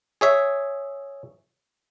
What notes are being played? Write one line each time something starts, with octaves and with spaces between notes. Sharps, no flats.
G#4 C#5 E5